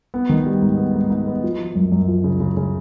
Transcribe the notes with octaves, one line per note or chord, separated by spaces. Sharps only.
B3
D#3
G3
G#2
B3
G#2
G#2
B3
F3
F3
F#2
F#2
F3
C#3
C#3
C#3